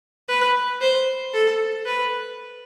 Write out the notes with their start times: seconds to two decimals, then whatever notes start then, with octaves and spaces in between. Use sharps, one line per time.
0.29 B4
0.81 C5
1.34 A4
1.86 B4